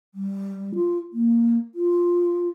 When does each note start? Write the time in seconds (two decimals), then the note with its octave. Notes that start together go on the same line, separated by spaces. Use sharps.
0.14 G3
0.75 F4
1.13 A#3
1.75 F4